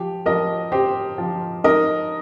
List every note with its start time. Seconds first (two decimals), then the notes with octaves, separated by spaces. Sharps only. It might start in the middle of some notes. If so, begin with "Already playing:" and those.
Already playing: F3 G4
0.26 F3 A#4 D#5
0.72 C4 G4 C5
1.18 F3
1.64 D#4 A#4 D#5